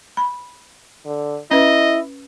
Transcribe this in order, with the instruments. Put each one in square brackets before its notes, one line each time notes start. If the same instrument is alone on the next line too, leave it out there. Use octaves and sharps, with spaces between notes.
[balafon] B5
[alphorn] D3
[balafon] C#4 B4 [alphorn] E4 [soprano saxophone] D#5